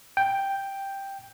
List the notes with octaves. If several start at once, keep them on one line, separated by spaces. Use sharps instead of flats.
G5